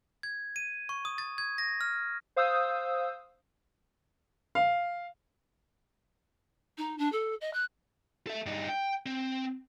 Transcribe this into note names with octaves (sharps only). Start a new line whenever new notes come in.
G#6
D#7
C#6
D#6
A6
G#6
A#6
F6
C5 F5 D#6 E6 G6
F5
D#4
D4
A4
D#5
F#6
A4 E5
G2 D#4
G5
C4